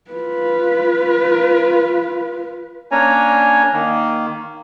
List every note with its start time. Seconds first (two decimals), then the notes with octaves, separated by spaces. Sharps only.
0.11 F4 B4
2.91 A#3 C#4 D4 C#5 G#5 A#5
3.73 D#3 A#3